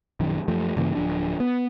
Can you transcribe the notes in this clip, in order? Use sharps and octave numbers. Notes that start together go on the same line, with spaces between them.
A#1 F#2 D#3
F#2 F3 A3
G2 C#3 E3 A#3
D1 F3 D4
B3